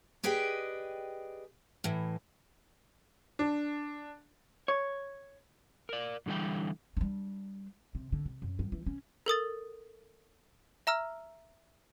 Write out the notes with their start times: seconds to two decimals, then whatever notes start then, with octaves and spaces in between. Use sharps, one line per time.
0.24 G4 G#4 B4 D5 D#5 G5
1.84 A2 E3
3.39 D4
4.68 C#5
5.89 A#4 D5
6.26 F#2 D3 E3 G3 G5
6.97 G3 D4
7.95 C3
8.12 D3
8.25 C3
8.42 F#2
8.59 G2
8.72 E3
8.86 C#4
9.26 A4 A#4 D#6 A6
10.87 E5 A#5 E6 F6